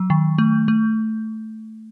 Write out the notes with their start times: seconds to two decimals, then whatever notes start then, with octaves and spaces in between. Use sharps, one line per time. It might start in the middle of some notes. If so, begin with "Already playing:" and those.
Already playing: F#3
0.10 D#3
0.38 A3
0.68 A3